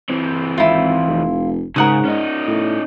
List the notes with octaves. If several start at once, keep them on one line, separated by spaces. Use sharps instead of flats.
E3 C4
G#1 E4 F4
F1
G#2 C#3 A#4 F#5 D#6
C#4 D#4
A2